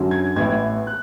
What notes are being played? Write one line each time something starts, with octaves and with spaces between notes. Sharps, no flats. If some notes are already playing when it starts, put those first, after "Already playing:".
Already playing: F#2 D3 F#3
G#6
A1 A2 E3 B3 E4 G#6
F#6